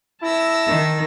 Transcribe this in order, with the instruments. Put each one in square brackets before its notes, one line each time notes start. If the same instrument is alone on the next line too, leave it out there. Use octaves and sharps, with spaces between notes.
[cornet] E4 [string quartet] A5 E6 A#6
[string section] D#3